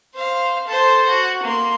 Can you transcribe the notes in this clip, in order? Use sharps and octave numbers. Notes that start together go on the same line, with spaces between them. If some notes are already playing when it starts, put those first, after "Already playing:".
C5 F5
A4 C5
F#4
A#3 C6